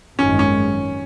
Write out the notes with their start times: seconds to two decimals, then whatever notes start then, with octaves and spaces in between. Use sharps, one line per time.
0.19 G#1 F#2 D#3 G#3 C#4
0.39 C#4